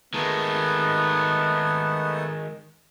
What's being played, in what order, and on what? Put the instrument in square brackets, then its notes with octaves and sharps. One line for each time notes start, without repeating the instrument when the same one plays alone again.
[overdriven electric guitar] D#3 G#3 [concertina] A3 D#4 A5 [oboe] B3